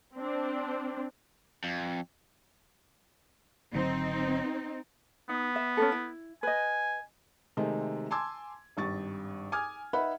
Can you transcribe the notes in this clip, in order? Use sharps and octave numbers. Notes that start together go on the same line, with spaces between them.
C4 D4
F2
G#1 D3 F#3 C4 D#4
B3 D#4
E5
C#4 D4 A4
E4
B4 D#5 G#5
C3 D#3 G#3 A3 C4
G#5 A5 C6 D6 E6 G#6
G#1 G2 C#6 A6
G#5 D6 D#6 F6 G#6
D#4 B4 E5 F#5 B5